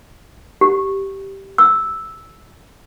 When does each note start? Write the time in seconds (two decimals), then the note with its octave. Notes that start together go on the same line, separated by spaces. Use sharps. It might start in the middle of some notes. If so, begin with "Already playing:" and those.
0.61 G4
1.58 E6